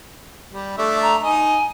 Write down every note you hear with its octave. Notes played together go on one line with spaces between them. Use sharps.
G3
A3 D4 E5
A#5
D#4 D#5 G#5